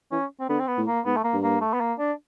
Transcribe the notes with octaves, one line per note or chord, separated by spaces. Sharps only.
E3 C#4
C4
D3 B3
C4
B3
A2
A#3
G#2 B3
A3
A#3
G2
A#3
A3
B3
A#3
D4